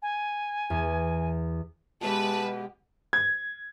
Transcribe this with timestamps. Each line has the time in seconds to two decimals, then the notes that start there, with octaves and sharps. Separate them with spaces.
0.02 G#5
0.70 E2
2.01 B2 G#3 G4 B4 E5 A5
3.13 G#6